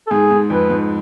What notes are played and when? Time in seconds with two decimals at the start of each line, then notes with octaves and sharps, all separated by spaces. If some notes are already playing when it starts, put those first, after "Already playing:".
0.07 A4
0.11 G#2 G#4
0.31 G#2
0.50 F2 B4
0.70 G#2